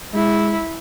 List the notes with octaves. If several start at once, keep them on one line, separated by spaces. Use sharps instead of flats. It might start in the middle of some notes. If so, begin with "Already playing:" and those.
G#3 E4